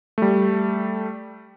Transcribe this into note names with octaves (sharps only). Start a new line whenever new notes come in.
G3 A3